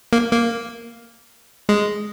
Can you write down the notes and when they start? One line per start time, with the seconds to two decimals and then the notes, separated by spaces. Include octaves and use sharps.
0.13 A#3
0.32 A#3
1.69 G#3